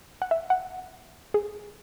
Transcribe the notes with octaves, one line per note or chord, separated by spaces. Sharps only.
F#5
E5
F#5
G#4